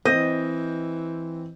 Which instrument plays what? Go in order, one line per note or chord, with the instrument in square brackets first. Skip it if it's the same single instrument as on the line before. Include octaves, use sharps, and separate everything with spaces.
[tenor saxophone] E3 [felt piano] C4 G6 [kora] D#5